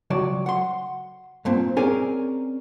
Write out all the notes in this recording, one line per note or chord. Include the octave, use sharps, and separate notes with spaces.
C#2 F#3 D5
F#5 C6
G2 A#2 C4
C4 C#4 G#4 A#4 D5 G#5